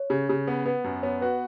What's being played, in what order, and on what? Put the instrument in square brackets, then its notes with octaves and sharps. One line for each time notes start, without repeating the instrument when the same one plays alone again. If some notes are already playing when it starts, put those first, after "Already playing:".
Already playing: [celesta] C#5
[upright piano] C#3
C#3
B3
[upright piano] B3 [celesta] B4
[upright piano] F#2
[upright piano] B3 [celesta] C#5
[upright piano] F#4 [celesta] B4